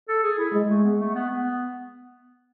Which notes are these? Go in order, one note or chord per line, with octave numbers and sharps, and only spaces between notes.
A4
G#4
E4
G#3
A3
B3
A3
B3
B3